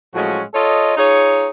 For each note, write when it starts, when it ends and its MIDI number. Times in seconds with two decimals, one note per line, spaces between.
0.15 0.42 45
0.15 0.42 53
0.15 0.42 54
0.15 0.42 56
0.15 0.42 61
0.15 0.42 66
0.54 0.96 65
0.54 0.96 69
0.54 0.96 73
0.54 0.96 75
0.97 1.50 63
0.97 1.50 65
0.97 1.50 68
0.97 1.50 73